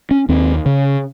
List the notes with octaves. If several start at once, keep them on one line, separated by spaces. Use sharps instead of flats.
C#4
D#2 C4
C#3